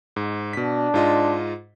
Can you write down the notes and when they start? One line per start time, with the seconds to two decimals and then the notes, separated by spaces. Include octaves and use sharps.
0.16 G#2
0.53 B2 D4 B6
0.94 G#2 F4 D#5